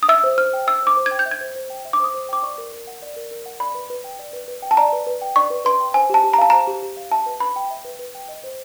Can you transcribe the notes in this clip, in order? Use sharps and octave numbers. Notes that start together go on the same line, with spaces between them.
D#6
E5 E6
C5
C5 F6
G5
E5 E6
C5 D6
C5
G#6
G5
G6
E5
G#6
C5
C5
G5
E5
D6
C5 D#6
C5
G5 D6
D5 C#6
A#4
A#4
F#5
D5
A#4
A#4
F#5
D5 B5
B4
B4
G5
D5
B4
B4
G5
A5
D5 A#5
B4
B4
G5
D5 C#6
B4
B4 C6
G5
C5 G#5
G4 A5
G4
A#5
F5 A5
C5 A#5
G4
G4
F5
E5 A5
B4
B4 B5
G5
E5
B4
B4
G5
D#5
C5